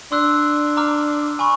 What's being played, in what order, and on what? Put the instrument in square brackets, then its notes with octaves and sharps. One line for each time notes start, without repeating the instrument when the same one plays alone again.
[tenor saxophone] D4 [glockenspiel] C6 E6 F#6
[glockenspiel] A#5 D6 F6
G#5 B5 C#6